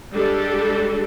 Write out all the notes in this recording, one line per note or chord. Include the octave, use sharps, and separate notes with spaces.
G3 G#3 D4 G4 A4